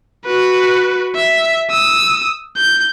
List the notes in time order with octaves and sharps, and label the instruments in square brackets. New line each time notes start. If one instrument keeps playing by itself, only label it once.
[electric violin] F#4 B4
E5
D#6 E6
G6